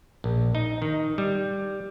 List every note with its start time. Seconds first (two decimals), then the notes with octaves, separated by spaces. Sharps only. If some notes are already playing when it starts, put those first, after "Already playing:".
0.24 A#1
0.55 D#4
0.82 D#3
1.18 G3